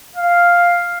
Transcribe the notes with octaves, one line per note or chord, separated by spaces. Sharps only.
F5